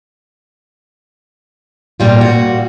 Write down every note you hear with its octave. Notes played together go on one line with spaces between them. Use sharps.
A#2 G3 F4
A#2 F#4